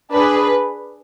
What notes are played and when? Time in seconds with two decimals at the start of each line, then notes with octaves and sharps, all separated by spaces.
0.13 D4 G#4 B4